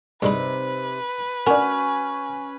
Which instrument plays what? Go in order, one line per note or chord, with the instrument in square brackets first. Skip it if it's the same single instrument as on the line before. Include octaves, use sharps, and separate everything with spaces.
[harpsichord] G2 G#3 B5 [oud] C3 D#4 [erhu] B4
[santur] C#4 [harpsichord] D4 A#4 [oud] F#4